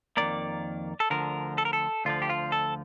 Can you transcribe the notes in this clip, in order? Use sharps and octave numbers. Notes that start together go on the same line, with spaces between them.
F2 D#3 A#3 D5
A4
D2 D3 F3 A#4
A4
A#4
A4
D2 D3 F3 F4
G4
F4
A4